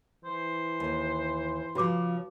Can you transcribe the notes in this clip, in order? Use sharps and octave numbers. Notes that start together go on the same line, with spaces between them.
E3 C5
D#2
C#3 F3 F#4 B4 D6